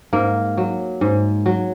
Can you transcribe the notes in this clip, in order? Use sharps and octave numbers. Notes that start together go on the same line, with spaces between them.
G#2 A#3
F#3
G#2
F#3